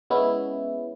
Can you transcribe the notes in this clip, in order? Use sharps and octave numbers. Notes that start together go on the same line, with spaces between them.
G#3 B3 C#4 E4